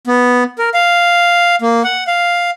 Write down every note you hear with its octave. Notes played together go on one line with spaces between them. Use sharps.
B3
A#4
F5
A#3
F#5
F5